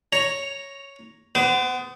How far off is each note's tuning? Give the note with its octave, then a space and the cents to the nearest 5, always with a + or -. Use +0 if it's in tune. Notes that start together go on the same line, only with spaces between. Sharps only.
C#5 +0 A#5 +0
B3 +20 C5 -35 D6 +0